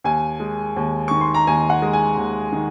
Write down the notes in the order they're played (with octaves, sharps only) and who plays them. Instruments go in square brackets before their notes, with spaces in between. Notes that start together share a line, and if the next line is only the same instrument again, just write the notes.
[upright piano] D#2 G#5
G#3
D#2
D#3 C#6
C6
A#5
D#2 G#5
F#5
G#3
G#5
D#2
D#3